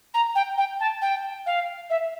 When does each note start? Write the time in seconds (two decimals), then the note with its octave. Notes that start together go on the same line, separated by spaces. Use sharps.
0.14 A#5
0.35 G5
0.57 G5
0.80 A5
1.01 G5
1.46 F5
1.90 E5